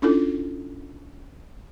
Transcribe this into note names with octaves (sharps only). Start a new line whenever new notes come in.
C#4 D4 E4 F4 A4